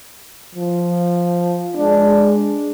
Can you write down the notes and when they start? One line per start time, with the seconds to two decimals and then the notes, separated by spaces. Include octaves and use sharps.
0.55 F3
1.76 G#3 D4